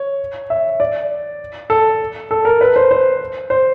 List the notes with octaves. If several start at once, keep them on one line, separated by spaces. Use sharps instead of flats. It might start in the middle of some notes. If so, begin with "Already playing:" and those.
Already playing: C#5
E5
D5
A4
A4
A#4
B4
C5
C5
C5